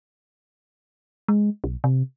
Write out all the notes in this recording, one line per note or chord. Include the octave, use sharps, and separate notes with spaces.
G#3
B1
C3